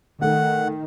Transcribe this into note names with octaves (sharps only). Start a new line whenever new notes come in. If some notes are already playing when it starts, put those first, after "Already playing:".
D#3 A3 F#5